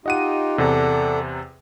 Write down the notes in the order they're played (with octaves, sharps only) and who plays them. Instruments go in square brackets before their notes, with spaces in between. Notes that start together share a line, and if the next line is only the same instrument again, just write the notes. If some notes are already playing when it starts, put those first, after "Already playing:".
[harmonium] D#4 F4 G4 [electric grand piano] D#5 F#5 D#7
[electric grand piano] E2 C3 [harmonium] A4 D5 F#5